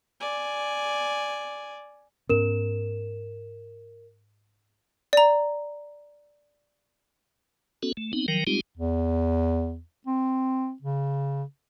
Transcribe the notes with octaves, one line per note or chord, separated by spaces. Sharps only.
D5 G#5
G#2 B3 C#4 A#4 E7
D5 A#5
B3 C#4 F#4 A4
A3
B3 C4 D#4
D#3 F3 F#3 A#4 G5
G3 G#3 C4 D#4 F4 G4
E2
C4
C#3